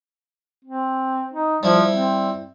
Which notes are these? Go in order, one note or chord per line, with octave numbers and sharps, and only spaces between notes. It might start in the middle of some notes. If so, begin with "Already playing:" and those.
C4
D#4
F3 G3 E4
C4